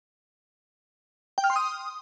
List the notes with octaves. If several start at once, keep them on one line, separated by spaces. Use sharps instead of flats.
G5
F6
C6
D#6